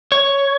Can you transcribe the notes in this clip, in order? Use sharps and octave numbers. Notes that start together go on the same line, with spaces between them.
C#5